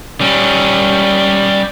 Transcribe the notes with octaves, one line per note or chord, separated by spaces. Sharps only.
G3 C#4